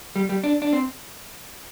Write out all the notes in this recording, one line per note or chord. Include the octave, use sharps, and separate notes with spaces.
G3
G3
D4
D4
C4